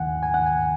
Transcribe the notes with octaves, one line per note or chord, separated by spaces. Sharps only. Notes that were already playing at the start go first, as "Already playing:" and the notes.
Already playing: D#2 D#3 F#5 G#5
G#5
F#5
G#5